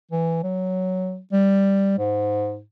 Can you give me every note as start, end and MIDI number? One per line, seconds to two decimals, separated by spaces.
0.12 0.39 52
0.43 1.19 54
1.32 1.93 55
1.98 2.61 44